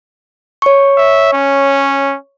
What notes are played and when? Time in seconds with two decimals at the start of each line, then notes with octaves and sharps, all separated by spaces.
0.62 C#5 C#6
0.98 E5
1.33 C#4